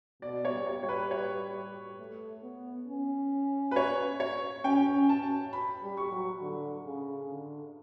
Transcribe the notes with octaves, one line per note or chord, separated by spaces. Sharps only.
B2 D5
C#5
G3
C#5
G3 C#5
B4
C#5
A3
B3
C#4
B4
C#5
C#5
C#4 G5
C#4
A5
B5
G3
C#6
F#3
D3
C#3
D3